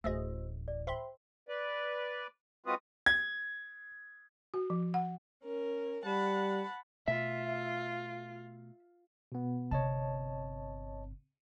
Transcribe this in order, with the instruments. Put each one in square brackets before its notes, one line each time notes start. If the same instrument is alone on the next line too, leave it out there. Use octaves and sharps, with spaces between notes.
[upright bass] D1 A1 [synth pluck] A3 G#4 D#5 [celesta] F#4 C5 E6
[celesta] D5
[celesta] C5 G5 [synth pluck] E5 B5 C6
[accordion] B4 D5
G#3 C4 F4 F#4 B4 D#6
[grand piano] G#6
[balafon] F#4
F3
F#5
[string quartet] C#4 A#4
[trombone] G3 [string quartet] F#5 A5 B5
[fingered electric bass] B2 A3 [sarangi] F4 [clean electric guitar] E5
[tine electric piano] B2 B3
[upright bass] G1 C3 [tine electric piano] C#5 D#5 A5